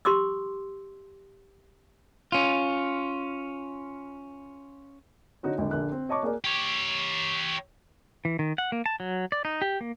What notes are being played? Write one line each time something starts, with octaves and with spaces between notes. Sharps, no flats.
G4 C6 D6 E6
C#4 F4
D3 D#4 F#4 C#5
G#1 D3
A#1 D3 A#3 F#6
C4
C#5 D#5 A5 C#6 D6
A#3 G#4 A#4 D5
G4 C#5
E3
D#3
F#5
A#3
A5
F#3
D5
D#4
G4
A#3